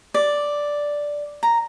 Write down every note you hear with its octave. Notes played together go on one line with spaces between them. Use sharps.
D5
A#5